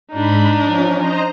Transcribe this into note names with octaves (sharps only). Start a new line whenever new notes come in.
G#2 D4 D#4 B5
F3 C#4
C5 D#5 A#5